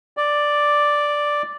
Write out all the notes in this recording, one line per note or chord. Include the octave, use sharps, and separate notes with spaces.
D5